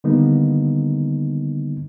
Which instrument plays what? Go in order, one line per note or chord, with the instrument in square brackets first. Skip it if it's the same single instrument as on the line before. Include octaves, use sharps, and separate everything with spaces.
[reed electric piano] D3 D#3 G3 A#3 B3 D#4